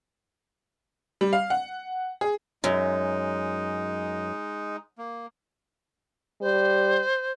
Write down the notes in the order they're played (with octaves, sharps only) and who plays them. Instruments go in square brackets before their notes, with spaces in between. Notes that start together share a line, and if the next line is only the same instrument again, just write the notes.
[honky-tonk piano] G3
F5
F#5
G#4
[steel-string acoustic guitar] F#2 [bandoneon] G#3 D#4
[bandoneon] A#3
[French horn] G3 [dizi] C5